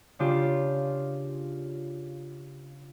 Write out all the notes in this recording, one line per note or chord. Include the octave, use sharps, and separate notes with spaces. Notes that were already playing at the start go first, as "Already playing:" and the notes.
C#3 D4 F4 G4